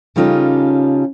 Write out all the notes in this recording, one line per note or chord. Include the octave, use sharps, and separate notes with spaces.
C#3 G3 C#4 D#4 F4 A4